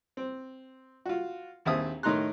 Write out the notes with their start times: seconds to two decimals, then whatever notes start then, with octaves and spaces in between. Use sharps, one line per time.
0.17 C4
1.06 F4 F#4
1.65 A#1 D#2 C4 E5 D#6
2.03 A2 D#3 D#4 A#5 C6 F#6